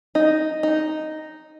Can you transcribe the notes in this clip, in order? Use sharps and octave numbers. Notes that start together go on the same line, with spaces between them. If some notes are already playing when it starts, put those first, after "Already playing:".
D#4
D#4